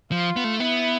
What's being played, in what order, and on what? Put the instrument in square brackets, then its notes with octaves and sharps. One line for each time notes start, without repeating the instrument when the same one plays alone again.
[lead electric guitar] F3 [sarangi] F4
[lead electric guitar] B3
A3
[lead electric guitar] B3 [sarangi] E4